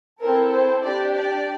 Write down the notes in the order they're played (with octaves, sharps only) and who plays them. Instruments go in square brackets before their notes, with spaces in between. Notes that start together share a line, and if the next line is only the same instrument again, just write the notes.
[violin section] C4 E4 A4 A#4
C5
D4 G4 D5
D5